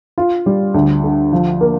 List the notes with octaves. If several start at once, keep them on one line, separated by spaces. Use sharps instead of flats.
F4
G3
D2
D3
F3
A#3